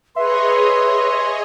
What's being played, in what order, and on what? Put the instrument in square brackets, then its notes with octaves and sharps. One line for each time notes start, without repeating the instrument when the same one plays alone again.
[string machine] G#4 C#5 D#5 [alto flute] B4 [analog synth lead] E5 [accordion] C6